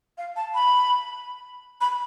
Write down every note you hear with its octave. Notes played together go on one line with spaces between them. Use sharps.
F5
A5
B5
B5